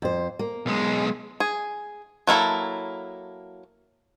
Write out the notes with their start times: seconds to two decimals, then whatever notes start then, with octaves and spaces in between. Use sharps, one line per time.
0.02 F2 C5
0.39 A#3
0.66 B1 G#3
1.40 G#4
2.27 F#3 A#3 E4 A4